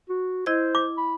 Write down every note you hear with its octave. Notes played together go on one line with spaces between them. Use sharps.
F#4
E4 C5 D#5 G#6
D6
B5